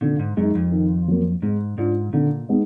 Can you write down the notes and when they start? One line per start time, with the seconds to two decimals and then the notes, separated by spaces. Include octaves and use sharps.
0.01 A#2 D3
0.19 G#2
0.37 F#2 G#3 D#4
0.55 F2
0.72 D#3
1.08 F#3 A#3
1.42 G#2 G#3
1.78 G#2 D4 F4
2.13 A#2 D3
2.49 G#3 B3 D#4